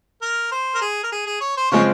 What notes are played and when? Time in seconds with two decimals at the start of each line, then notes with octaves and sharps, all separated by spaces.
0.22 A#4
0.52 C5
0.75 A#4
0.81 G#4
1.04 A#4
1.12 G#4
1.26 G#4
1.41 C#5
1.57 C5
1.71 C#3 F3 G#3 C4 C#5